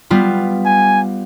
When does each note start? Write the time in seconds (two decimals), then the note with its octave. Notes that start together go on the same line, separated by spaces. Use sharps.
0.10 G3 B3 F4
0.65 G#5